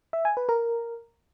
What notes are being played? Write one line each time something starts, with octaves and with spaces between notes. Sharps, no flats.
E5
G#5
B4
A#4